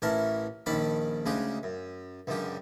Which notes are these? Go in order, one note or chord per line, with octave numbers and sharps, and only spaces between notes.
A1 E3 C#4 A#4 A5
A#1 D#3 C#4 A5 B5 D6
D2 C#3 G#3 G4 G#4
F#2
C#2 F#2 D3 G4